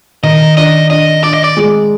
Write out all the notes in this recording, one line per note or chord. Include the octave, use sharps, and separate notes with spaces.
D#3 D#5
D4 D#5
D4 D#5
D4 D5
D#5
D5
G#3